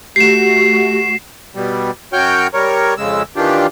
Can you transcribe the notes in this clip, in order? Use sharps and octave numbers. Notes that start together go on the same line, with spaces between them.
A3 F#4 G4 C7 E7
B2 G3
F#2 F#4 C#5 G5 F6 G6
G3 A#4 C#5
F2 C#3 G#3 E6
D#3 E3 D4 F4 G4